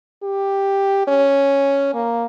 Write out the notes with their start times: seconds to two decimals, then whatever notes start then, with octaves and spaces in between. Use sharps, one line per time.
0.23 G4
1.08 C#4
1.94 A#3